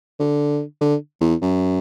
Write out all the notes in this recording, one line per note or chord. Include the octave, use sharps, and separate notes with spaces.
D3
D3
E2
F#2